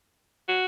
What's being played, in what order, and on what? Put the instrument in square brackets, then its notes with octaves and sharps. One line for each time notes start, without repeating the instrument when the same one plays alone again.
[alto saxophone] F#4